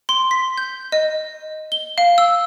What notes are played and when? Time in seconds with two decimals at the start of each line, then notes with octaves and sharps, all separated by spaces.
0.09 C6
0.31 B6
0.58 G6
0.92 D#5
1.72 G7
1.98 F5
2.18 E6